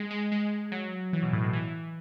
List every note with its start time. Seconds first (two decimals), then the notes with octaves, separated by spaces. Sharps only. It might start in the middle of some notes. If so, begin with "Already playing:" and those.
Already playing: G#3
0.11 G#3
0.32 G#3
0.72 F#3
1.13 E3
1.22 B2
1.33 A2
1.43 B2
1.53 E3